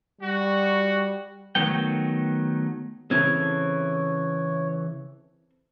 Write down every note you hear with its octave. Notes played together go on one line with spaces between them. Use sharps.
G3 F#4
D#3 F#3 A3 B3 G5
C#3 E3 C4 E4 A4 C#5 G#6